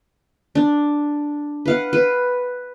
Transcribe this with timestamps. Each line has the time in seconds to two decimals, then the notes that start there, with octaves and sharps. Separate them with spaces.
0.55 D4
1.66 B4 F5 F#5
1.93 B4